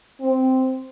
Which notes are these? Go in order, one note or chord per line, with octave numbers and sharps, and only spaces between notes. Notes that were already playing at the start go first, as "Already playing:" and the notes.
C4